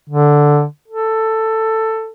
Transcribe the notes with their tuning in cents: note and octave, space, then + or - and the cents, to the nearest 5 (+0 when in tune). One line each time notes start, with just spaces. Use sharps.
D3 +0
A4 +10